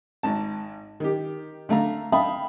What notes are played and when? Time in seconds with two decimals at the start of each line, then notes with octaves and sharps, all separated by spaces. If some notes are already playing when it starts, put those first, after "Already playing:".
0.23 G#1 G#2 A5
1.00 D#3 G4
1.69 D3 A3 F5 A#5
2.12 E5 F5 G5 A5 B5 D#6